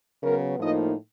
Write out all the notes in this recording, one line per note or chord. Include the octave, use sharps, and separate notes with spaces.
C#3 F#3 B3 A#4
A2 F3 A#3 D#4 D#5